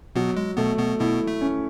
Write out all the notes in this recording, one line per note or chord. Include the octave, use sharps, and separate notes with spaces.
B2 F#3 B3
G#3
B2 A3 B3
B2 B3
B2 B3 E4
A3
C#4